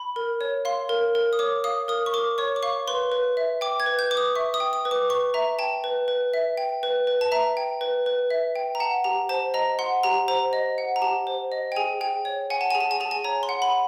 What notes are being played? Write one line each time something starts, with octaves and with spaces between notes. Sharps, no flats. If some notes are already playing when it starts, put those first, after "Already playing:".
Already playing: B5
A#4
C#5
F5 C6
A#4
A#4
D#6
C#5 D6
F5 D#6
A#4 D#6
C#6
A#4 D6
C#5 C#6
D6
F5 C#6
B4 C6
B4
E5
G5 D6
G#6
B4
G6
B4 D6
D#6
E5 C#6
D#6
G5
D#6
B4
D6
B4 C#6
E5 A#5
G5 A5
B4
B4
E5
G5
B4
B4
A5
E5 A#5
G5
B4
B4
E5
G5
A#5
F#5 A5
G4 A#5
C5 A5
D#5 A#5
F#5 C6
G4 A#5
C5 A#5
D#5
F#5
A#5
G4 A5
C5
D#5
G5
G#4 G#5
G#4 G5
C#5
F#5 G#5
A5
G#4 G#5
A5
G#5
G#4 A5
G#5
C#5 A#5
C6
F#5
B5